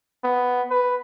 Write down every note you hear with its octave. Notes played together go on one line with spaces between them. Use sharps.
B3
B4